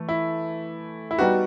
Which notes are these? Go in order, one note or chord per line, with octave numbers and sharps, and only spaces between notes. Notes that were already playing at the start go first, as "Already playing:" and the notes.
Already playing: E3 A3
E4
E4
G3 B3 D#4 F#4 G4